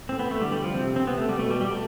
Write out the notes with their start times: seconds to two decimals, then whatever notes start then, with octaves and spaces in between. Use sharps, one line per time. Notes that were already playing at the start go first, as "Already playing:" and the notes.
0.09 A2 C4
0.19 B3
0.31 A3
0.41 D3 G3
0.52 G3
0.64 F3
0.74 C3 C4
0.96 C4
1.07 C3 B3
1.18 A3
1.29 G3
1.39 B2 A3
1.51 G3
1.61 G3
1.71 A3